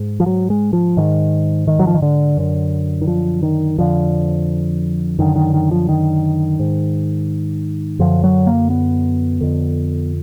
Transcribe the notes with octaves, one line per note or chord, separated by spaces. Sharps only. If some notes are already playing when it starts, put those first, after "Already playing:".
Already playing: G#2
F3
F#3
G#3
F3
G#2 D#3
D#3
F#3
F3
D#3
D3
F#2 D3
D#3
F3
D#3
F2 D3 F3
F#2 D3 D#3
D#3
D#3
F3
D#3
G#2
F#2 D3 F3
F#3
A#3
B3
F2 D3